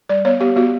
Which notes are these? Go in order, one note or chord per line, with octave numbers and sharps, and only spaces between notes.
G3 D5
B3 C#5
B3 G4
B3 F#4